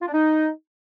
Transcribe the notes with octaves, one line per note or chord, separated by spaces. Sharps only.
F4
D4
D#4